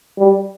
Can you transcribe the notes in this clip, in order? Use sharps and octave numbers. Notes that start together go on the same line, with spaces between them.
G3